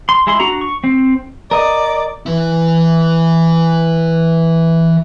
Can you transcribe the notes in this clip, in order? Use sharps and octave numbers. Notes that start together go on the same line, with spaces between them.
C6
G#3 E4 C6
D4 F#4 A#5
C#6
C4
A#4 D5 D#5
E3 E4